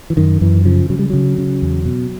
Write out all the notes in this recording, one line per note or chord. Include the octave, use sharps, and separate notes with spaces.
E3
F#2 D#3
F#2 E3
C#3 F3
C#3 F#3
G3
C#3 F#3
C#3
E2
B2